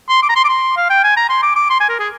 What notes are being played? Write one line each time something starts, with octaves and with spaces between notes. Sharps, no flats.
C6
D6
A#5
C6
D6
C6
F5
G5
G#5
A#5
C6
D6
D6
C6
G#5
A#4
G#4